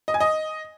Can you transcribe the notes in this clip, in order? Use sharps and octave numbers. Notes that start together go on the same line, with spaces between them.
D#5
G#5
D#5